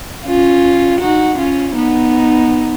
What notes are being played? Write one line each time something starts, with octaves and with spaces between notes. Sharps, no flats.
C#4 F4
D#4 F#4
C#4 F4
B3 D#4